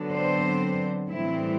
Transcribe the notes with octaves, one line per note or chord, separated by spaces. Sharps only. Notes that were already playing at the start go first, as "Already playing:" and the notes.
Already playing: D3 F#3 B3 D4
C4 C5
A2 E3 G3 C4 E4